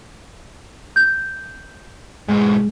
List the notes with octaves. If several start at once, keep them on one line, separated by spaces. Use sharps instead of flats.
G6
G#2 B2 G#3